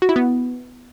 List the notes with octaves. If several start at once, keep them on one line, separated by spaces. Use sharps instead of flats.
F#4
E4
B3